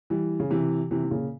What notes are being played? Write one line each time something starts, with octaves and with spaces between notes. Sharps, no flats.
E3 G3
C#3
C3 E3
C3 E3
E3
A#2 C#3